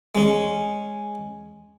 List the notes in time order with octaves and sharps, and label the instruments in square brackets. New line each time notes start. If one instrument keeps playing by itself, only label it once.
[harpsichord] G#3 C#4